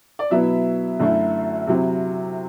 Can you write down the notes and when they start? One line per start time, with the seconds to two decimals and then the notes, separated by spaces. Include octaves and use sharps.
0.19 D5
0.30 B2 F#3 B3 E4 E5
1.00 F#2 D3 A3 E4
1.67 C3 F#3 C4 E4